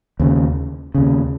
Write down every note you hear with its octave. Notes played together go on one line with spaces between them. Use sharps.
D#2 C#3
D#2 C#3